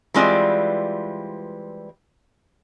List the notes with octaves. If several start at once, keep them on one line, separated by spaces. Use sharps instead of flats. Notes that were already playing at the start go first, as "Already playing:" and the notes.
E3 G3 G#3 C4 F4 D5